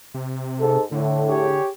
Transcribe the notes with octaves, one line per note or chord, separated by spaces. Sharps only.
C3
G#2 A4
A2 D3
G4 G#4 C#5